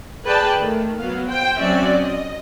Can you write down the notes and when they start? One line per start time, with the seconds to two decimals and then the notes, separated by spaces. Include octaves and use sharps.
0.24 G#4 B4 D5 G5 A5
0.59 D#3 A3
0.98 F#3 B3 F5
1.27 C5 G5
1.58 F#3 C4 C#4 D5 E5
1.94 D#5